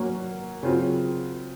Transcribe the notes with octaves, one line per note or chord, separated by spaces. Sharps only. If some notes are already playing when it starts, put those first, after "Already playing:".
Already playing: F#3 A#3 C#4 F#4
C#3 F#3 C4 F4